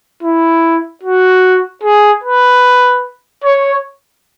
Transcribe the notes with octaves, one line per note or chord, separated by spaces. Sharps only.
E4
F#4
G#4
B4
C#5